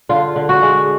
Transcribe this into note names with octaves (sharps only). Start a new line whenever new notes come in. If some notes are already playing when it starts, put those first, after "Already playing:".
D3 F4
D3
F#4
G#3